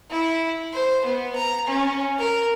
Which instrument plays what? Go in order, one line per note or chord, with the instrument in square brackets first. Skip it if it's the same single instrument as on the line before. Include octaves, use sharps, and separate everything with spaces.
[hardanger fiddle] E4
C5
B3
A#5
C#4
A#4